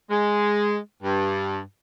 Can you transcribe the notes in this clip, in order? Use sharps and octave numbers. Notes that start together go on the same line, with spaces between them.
G#3
G2